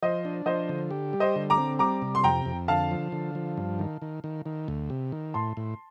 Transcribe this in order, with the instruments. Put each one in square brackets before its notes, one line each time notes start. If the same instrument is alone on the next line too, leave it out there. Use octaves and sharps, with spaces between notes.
[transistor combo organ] F3 [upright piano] C5 D#5
[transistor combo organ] D4
[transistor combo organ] F3 [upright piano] C5 D#5
[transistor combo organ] D3
G4
G3
[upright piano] C5 D#5
[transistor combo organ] D3
[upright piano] A#5 D6
[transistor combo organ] C4
[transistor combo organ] G3 [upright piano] A#5 D6
[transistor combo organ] C3
[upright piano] C6
[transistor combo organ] F2 [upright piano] G5 A#5
[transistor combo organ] F2
[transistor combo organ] D3 [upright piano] F5 A5
[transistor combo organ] F3
D3
F3
G2
D#3
D#3
D#3
D#3
D2
C3
D#3
[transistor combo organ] A2 [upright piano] A5 C6
[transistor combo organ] A2